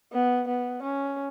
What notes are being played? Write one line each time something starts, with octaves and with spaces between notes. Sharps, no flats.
B3
B3
C#4